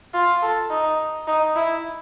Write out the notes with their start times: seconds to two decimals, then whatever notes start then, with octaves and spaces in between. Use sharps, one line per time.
0.14 F4
0.42 A4
0.70 D#4
1.27 D#4
1.56 E4